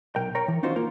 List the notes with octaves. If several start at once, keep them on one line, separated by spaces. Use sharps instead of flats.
B1 A#4 G5
A#4 C#5 G5 A#5
E3
C#4 D#4 F4 F#4 C5
A#3 F4 A#4